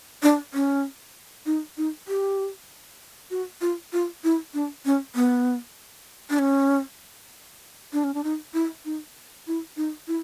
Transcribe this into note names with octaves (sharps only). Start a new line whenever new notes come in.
D4
C#4
D#4
D#4
G4
F#4
F4
F4
E4
D4
C#4
B3
D4
C#4
D4
C#4
D4
D#4
E4
D#4
E4
D#4
E4